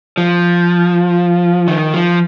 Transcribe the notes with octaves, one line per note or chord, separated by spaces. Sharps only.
F3
D#3
F3